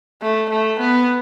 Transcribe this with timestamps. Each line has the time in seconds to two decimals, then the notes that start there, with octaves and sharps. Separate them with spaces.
0.22 A3
0.51 A3
0.80 B3